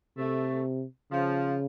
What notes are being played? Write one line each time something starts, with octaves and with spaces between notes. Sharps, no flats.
C3 A3
C#3 F3